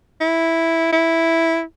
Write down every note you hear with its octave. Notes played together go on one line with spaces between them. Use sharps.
E4
E4